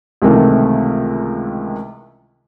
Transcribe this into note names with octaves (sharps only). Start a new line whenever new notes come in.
C#2 C3 D#3 E3 A3